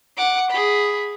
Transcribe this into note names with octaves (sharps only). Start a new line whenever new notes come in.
F#5 D6
G#4 B5